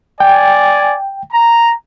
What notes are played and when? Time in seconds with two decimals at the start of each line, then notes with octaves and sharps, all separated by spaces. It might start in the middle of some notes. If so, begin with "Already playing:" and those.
0.20 D5 G5 G#5
1.32 A#5